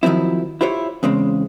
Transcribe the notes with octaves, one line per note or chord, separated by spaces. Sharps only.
D#3 F3 F#3 C4 E4
E4 F4 G4 C5 C#5
E2 C#3 G#3 C4